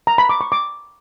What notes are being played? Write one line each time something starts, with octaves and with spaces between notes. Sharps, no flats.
A#5
B5
D6
C#6
D6